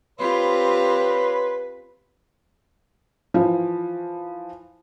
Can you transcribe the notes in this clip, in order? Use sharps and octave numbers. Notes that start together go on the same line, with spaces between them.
C4 F4 G4 B4 C#5 B5 C6
E3 F3